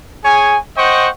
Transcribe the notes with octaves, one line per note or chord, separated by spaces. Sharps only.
G#4 C#5 G#5
C5 D#5 F#5 G5 C#6